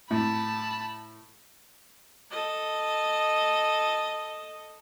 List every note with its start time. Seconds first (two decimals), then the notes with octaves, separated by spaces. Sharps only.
0.10 A2 A5 B5
2.31 A4 D#5